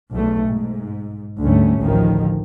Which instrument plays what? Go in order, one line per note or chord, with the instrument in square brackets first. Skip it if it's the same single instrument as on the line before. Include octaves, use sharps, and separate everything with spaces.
[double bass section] B1 E2 A3
G#2
D2 G#2 G3 A3 C#4
A1 D2 D#3 F3